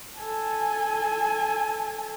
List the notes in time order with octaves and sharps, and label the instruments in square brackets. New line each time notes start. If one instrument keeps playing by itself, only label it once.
[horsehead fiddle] A4 G#5